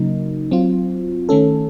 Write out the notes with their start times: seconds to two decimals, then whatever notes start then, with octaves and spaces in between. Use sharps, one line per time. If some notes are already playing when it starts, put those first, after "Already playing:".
Already playing: C#3 F#3 A#3 D#4
0.51 F#3 C4 F4
1.29 D#3 A3 C#4 A4